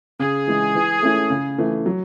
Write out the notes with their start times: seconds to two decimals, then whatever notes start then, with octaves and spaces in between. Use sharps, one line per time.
0.19 C#3 G#4
0.47 E3 G#3
0.75 E3
1.02 A3 C#4 E4
1.30 C#3
1.58 E3 A3
1.86 F#3